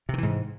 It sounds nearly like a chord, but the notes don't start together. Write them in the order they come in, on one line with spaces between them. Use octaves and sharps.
C3 D#3 E3 G#2